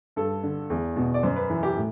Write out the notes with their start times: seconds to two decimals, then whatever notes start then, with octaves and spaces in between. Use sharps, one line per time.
0.16 G2 A4
0.43 D3
0.70 E2
0.96 B2
1.14 D5
1.23 F#2 C5
1.36 B4
1.50 E3
1.63 G4
1.77 A2